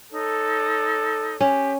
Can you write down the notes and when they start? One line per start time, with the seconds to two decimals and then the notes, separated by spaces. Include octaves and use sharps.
0.12 D#4 A4 C#5
1.41 C#4 G4